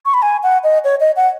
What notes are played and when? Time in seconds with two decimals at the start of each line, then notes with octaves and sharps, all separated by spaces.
0.05 C#6
0.14 B5
0.22 G#5
0.43 F#5
0.64 D#5
0.84 C#5
1.00 D#5
1.16 F#5